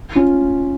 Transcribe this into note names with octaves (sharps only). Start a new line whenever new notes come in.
C#4 F4